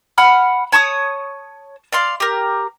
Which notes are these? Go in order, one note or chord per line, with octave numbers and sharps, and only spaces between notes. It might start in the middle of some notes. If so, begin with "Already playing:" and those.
F#5 B5 F6
C#5 A5 C#6 D#6
D5 F5 C6
G4 A#4